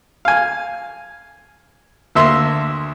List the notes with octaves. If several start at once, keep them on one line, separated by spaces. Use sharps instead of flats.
F5 G#5
D2 A#3 E5 C6